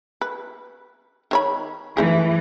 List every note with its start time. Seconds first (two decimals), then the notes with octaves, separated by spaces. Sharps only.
0.21 B4
1.31 D#3 C#5 B5
1.97 E3 F3 A3 G#4